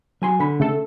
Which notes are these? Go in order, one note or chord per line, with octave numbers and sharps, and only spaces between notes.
F#3 G#5 C6
D3 B5
C#3 A3 A4